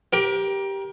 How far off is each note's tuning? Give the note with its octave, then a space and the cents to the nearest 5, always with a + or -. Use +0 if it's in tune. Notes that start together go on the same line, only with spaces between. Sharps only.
G4 +0 A#4 +30